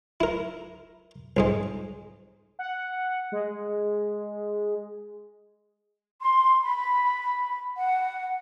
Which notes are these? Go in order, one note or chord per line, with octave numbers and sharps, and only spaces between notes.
E4 A#4
C2 G#2 G#3
F#5
G#3
C6
B5
F#5